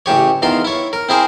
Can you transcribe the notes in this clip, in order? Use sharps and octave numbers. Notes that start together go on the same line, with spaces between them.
A1 C#3 G4 C#5
E2 D#3 F4 A#4 C6
E4 C#5
A#4
C4 E4 G#4 A#4 C5